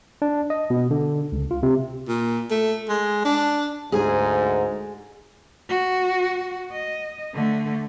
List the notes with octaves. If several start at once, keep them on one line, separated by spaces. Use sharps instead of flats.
D4
D#5
B2
D3
C#2
F4
C3
A#2
A3
G#3
D4
D2 G#2 G#4 G#5
F#4
D#5
D3 A3